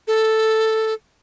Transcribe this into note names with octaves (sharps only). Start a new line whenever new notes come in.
A4